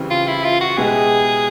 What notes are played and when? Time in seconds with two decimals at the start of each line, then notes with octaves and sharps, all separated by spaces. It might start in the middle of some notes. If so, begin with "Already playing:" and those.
Already playing: C#3 E3 G3 C4
0.10 F4
0.27 E4
0.44 F4
0.61 F#4
0.77 B2 G#3 B3 E4 G4 G#4